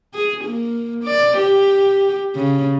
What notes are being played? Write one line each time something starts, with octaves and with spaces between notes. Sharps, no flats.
G#4
A#3
D5
G4
C#3